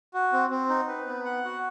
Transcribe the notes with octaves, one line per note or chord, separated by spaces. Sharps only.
F#4
C4
C4
D#4
B4
B3
F#5
F#4